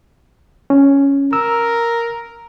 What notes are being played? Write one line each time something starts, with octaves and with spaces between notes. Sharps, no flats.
C#4
A#4 E6